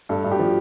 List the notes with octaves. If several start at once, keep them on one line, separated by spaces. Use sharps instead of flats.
G2 A4
G2
G4
F3